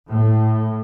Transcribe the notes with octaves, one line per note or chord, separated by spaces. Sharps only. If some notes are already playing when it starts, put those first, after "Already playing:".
A2